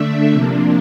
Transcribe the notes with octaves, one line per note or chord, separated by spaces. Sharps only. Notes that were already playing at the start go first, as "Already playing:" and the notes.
Already playing: D3 A3 D4 E5
C3 F3 A#3 D4